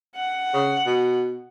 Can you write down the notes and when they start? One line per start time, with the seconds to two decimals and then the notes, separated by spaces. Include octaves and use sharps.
0.16 F#5
0.54 C#3
0.86 B2